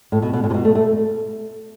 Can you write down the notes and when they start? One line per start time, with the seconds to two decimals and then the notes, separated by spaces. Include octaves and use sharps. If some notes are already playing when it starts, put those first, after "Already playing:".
0.12 A2
0.22 B2
0.33 B2
0.44 A2
0.50 C3
0.54 B2
0.65 A3
0.75 A3